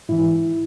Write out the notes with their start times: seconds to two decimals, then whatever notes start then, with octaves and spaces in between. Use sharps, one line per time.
0.09 G#2 E3 E4